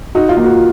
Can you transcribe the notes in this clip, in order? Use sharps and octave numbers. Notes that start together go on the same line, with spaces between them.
D#4 F#4
F4
A#3
F#4